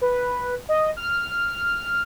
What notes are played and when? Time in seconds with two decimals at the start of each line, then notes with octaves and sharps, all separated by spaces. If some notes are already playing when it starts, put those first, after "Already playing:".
0.01 B4
0.69 D#5
0.97 F6